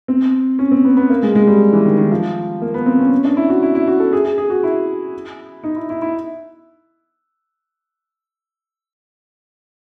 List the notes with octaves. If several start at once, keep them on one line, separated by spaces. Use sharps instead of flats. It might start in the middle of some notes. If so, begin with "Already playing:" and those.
C4
C#4
C4
B3
B3
A#3
G#3
G#3
G3
E3
D#3
D#3
F3
A#3
B3
C4
C#4
C#4
D4
E4
F#4
E4
E4
F#4
A4
G#4
G#4
G#4
F#4
E4
D#4
E4
E4
E4